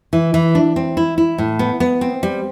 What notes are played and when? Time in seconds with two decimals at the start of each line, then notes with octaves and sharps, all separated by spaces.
0.13 E3
0.34 E3
0.55 D4
0.76 C4
0.97 E4
1.18 E4
1.38 A2
1.59 B3
1.80 B3
2.01 C4
2.23 G3